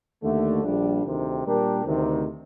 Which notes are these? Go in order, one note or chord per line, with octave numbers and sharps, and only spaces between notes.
D#2 D3 A3
A#1 A#2 G3 D4
D2 C3 D#3
A#2 G3 D4 G4 A#4
D2 C3 D#3